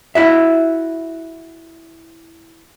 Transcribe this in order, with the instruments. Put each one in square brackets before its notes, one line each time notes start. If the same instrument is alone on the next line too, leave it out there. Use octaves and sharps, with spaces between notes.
[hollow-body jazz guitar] E4 F#4 E5